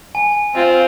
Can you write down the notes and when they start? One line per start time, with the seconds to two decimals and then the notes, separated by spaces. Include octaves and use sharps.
0.15 G#5
0.55 C4 F4